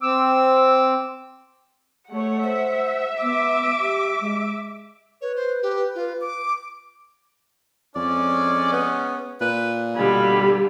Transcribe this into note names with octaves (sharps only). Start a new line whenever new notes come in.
C4 D6 E6
A3 C#5 F#5
C5 E5
B3 D6
G4
G#3
B4 C#5
C5
G4
F4
D6
F2 G#3 C#4 D5
B3
A#2 B4
B2 D3 G3 F5 G#5 B5